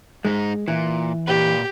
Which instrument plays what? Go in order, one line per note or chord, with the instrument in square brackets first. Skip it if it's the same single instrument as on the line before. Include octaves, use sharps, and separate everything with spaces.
[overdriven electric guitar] G#2 D#4 [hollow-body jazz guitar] G#3
[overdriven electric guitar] A#2 [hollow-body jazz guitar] E3
[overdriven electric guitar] A#2 B4 [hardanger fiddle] G4